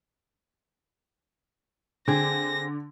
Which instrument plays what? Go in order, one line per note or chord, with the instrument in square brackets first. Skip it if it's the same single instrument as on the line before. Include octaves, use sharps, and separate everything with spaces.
[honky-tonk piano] D3 [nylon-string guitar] C4 G#4 [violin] A#6